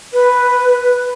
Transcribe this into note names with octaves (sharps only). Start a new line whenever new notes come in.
B4